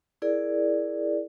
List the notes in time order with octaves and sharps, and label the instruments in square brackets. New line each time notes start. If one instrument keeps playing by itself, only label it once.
[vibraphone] E4 G#4 A#4 D5